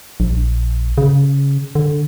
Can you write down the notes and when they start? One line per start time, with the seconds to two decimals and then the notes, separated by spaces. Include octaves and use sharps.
0.20 A#1
0.98 C#3
1.75 D3